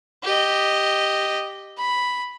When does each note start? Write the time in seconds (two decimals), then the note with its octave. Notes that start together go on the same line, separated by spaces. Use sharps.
0.24 G4 D#5
1.77 B5